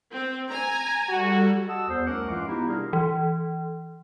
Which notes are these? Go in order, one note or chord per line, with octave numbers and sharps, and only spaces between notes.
C4
G#5 A#5
G3 F#4 A4
F#4 D#5 F#5 A5 E6
E2 C5
C2 A3 C#4 A#4 F#5 D6
G2 E3 G#3 F4 F5 D6
A#3 B3 D#4 E4 F#4 G4
C3 G3 D4 F4 G#4 A#4
E3